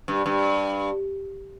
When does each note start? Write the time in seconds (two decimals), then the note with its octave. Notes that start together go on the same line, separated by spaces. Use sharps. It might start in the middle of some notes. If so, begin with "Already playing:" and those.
0.08 G2
0.26 G2